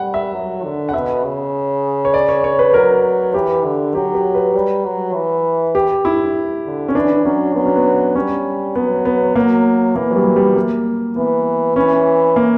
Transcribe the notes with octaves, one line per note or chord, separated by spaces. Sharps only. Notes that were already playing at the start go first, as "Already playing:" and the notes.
Already playing: G3 F#5
E5
F#3
D3
F#5
B2 E5
C#3
C#5
D5
C#5
C#5
B4
F#3 A#4
E3 G4
D3
F#3 G4
G4
B4
G3
F#3
E3
G4
G2 E4
D3
C#4
E3 D4
F#3 C#4
F#3 B3
C#4
B3
G3 C#4
F#3 B3
B3
F#3 A#3
E3 A#3
F#3
G3
G3
A#3
E3 B3
E3 C#4
A#3